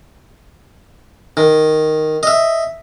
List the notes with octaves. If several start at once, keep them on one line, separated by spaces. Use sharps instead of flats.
D#3
D#5 E5